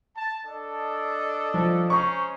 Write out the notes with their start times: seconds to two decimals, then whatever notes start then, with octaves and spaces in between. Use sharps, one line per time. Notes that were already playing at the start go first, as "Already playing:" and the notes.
0.17 A5
0.47 D4 A4 D#5
1.54 F3
1.90 G#3 C#4 C5 A#5 C#6